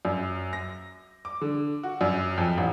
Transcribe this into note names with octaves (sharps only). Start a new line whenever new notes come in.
F#2
A#6
D6
D3
F#4
F#2
F2
A1